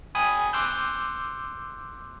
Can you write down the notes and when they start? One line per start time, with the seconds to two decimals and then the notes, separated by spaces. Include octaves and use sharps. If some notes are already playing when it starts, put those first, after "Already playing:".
0.15 G5 G#5 B5 D#6
0.53 C6 D6 E6 F#6 G6